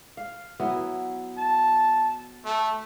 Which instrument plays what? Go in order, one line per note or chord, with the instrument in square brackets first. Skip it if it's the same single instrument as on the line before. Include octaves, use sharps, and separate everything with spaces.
[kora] F5
F#3 B3 E4
[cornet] A5
A3